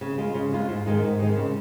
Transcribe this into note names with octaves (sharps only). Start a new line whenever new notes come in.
C#3
G#3 F4
C#3
G#3 F4
G#2
D#3 G#3 D#4
G#2
D#3 G#3 D#4
C#3